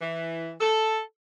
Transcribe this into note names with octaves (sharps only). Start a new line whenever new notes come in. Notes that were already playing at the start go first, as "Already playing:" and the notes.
E3
A4